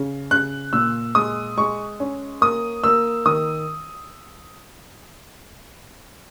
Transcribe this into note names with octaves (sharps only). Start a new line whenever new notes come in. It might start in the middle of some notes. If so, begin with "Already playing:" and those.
Already playing: C#3
C#3 F#6
A#2 E6
G#3 D#6
G#3 C#6
C#4
A#3 D#6
A#3 E6
D#3 D#6